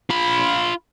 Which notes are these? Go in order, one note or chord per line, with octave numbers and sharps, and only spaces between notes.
F4 B5